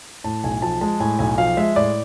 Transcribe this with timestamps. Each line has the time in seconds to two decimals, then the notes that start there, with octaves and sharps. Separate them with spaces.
0.24 A2 A5
0.44 B1 G#5
0.62 F3 A5
0.81 G#3 A5
1.00 A2 G#5
1.19 B1 G#5
1.38 F3 F5
1.57 G#3 E5
1.76 A2 D5